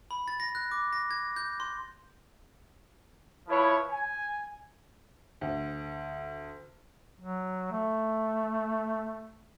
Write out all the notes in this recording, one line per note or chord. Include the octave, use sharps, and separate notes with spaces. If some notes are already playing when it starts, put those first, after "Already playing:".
B5
A6
A#6
F#6
D6
A#6
G#6
G6
C6
F3 E4 B4 C#5
G#5
D2
F#3
A3